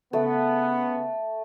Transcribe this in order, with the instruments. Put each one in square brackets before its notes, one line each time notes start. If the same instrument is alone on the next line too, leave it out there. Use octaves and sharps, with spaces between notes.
[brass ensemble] C#3 B3 [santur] A3